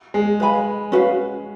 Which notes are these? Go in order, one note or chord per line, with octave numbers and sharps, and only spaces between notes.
G#3
B4 F5 G#5 B5
C#4 F#4 B4 F5